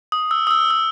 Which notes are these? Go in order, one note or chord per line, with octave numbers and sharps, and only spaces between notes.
D#6
E6
D#6
E6
E6